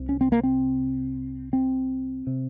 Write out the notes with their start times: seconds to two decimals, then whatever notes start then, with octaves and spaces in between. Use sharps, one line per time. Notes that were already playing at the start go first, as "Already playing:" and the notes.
Already playing: C2 C3
0.09 C#4
0.21 C4
0.32 A#3
0.43 C4
1.53 C4
2.27 C3